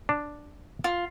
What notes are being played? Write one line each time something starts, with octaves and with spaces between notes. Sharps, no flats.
D4
F4